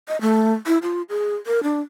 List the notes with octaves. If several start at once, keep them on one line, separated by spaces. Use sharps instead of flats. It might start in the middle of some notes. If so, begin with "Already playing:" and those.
D#5
A3
E4
F4
G#4
A#4
D4